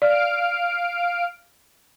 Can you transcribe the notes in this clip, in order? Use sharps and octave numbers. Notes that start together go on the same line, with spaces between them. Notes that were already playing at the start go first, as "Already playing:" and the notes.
D5 F5 F6 D7